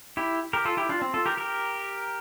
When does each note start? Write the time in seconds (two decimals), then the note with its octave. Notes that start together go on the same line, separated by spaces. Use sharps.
0.17 E4 G4
0.53 G4 A#4
0.65 F4 A4
0.77 E4 G4
0.89 D4 F4
1.02 C4
1.14 F4 A4
1.26 G4 A#4
1.37 G4 A#4